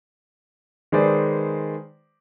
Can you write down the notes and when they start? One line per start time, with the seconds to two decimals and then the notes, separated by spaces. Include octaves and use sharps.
0.92 D#3 G#3 G#4 B4 C5 D5